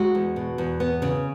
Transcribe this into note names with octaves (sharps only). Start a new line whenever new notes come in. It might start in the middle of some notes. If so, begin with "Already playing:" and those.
Already playing: G#3 F#4
E2
B2
E2
B3
C#3